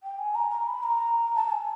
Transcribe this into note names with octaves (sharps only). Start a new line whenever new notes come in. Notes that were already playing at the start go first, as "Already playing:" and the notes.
G5
G#5
A#5
A#5
B5
A#5
A5
A5
G#5